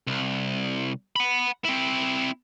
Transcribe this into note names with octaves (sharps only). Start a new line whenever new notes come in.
C2
F#5 B5
C4 E4